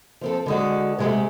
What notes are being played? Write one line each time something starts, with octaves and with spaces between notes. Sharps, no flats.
F3 C4 A4
D3 G#3 F#4
C3 G#3 A3